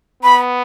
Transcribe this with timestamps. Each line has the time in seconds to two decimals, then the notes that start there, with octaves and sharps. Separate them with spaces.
0.23 B3 B5